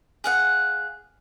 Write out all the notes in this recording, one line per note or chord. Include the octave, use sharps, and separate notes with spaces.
G#4 F5 F#5